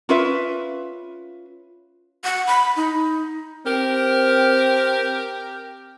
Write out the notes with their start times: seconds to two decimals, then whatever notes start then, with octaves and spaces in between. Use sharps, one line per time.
0.09 C#4 F4 B4 E5
2.24 F#5
2.47 B5
2.76 D#4
3.67 C4 G4 A#4